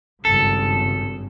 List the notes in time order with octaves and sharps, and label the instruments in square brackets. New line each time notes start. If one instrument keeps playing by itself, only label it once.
[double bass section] G#1 G2 C#3 [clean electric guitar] A4